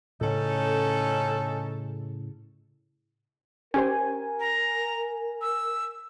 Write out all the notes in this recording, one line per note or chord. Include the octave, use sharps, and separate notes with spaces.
A2 C#3 C#4 D#4 A4
C#4 G4 A#4 C5 G#5
A#5
E6